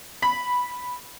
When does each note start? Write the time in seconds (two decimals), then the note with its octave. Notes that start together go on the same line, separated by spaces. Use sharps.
0.22 B5